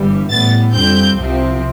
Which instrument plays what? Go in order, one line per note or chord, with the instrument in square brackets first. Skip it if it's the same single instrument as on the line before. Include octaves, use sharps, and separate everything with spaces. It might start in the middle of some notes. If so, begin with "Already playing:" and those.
Already playing: [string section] G1 G2 E3 G3
A1 A2 G3 B3 A6
F2 D3 G3 C4 G6
C2 C3 F3 C4